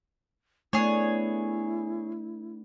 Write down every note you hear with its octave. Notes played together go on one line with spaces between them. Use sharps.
A3 B3 D4 E4 G#4 C#5